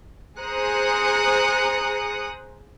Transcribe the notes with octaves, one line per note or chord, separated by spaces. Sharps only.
G#4 C5 A#5 D#6 F#6 C#7